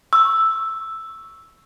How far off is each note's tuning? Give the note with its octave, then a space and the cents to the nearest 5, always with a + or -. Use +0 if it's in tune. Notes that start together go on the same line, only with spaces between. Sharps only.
C#6 +0 E6 +0